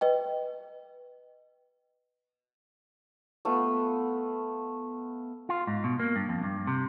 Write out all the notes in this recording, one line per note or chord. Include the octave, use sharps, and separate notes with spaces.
B4 D#5 G5
A3 B3 F4
F4
G#2
B2
A#3
G2
F2
G2
C3